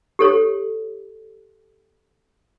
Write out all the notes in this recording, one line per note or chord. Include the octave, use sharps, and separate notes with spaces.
G4 A4 C#5